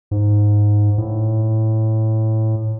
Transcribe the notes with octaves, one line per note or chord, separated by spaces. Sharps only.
G#2
A2